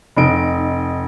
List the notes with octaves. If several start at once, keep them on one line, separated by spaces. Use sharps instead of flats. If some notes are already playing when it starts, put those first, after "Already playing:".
F1 D#4 D7